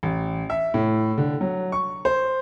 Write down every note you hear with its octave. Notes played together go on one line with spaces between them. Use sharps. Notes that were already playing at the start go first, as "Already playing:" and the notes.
A1
E5
A2
D3
F#3
C#6
C5